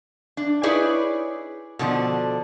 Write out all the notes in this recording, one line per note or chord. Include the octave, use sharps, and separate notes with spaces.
D4
D#4 E4 G#4 B4 C#5 D5
B2 D3 F3 D4